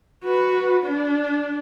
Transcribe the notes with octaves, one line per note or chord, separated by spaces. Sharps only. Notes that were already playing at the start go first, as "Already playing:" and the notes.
F#4 B4
D4